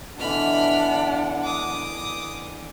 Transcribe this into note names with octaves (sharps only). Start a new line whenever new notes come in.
B2 D3 E3 D4 F#5 B5 F6
D6 D#6